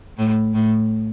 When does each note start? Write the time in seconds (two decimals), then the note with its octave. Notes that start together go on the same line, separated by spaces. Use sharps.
0.18 A2
0.54 A2